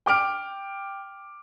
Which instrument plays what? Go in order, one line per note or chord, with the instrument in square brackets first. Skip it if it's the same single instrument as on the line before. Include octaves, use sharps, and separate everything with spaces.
[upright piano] G5 D6 F6 D7